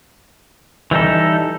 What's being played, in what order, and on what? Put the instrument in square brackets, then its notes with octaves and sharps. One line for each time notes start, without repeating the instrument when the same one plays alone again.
[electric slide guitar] E3 G3 D#4 A4